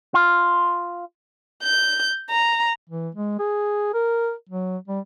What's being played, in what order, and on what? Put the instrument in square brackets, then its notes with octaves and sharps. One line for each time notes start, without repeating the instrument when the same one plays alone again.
[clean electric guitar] F4
[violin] G6
A#5
[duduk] E3
G#3
G#4
A#4
F#3
G3